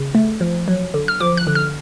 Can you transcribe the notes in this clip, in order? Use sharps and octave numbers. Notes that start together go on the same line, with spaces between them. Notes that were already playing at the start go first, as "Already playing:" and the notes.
Already playing: C#3
A3
F3
F#3
D3
F6
F3 D6
F#6
D3
F6